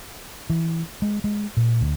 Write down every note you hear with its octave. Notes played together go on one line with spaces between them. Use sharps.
E3
G#3
G#3
A#2
D2